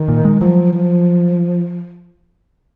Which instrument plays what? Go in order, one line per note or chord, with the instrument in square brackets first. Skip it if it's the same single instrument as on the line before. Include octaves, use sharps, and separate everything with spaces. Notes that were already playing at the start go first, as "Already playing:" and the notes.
Already playing: [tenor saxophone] D#3
[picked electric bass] A#2
G#3
[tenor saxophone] F3 [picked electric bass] F#3
[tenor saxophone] F3